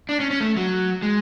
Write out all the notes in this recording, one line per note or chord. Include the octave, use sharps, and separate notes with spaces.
D4
C#4
C#4
A3
F#3
G#3